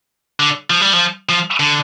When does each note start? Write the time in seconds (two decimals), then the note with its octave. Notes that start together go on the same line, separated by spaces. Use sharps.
0.40 D3
0.70 F3
0.81 G3
0.93 F3
1.29 F3
1.60 D3